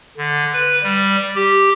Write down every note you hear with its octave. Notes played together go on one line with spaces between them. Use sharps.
D3
B4
G3
G4